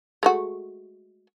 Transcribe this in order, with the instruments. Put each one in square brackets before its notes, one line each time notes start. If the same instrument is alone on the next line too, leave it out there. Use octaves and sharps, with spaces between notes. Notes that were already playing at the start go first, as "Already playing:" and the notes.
[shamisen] G#3 A3 F#4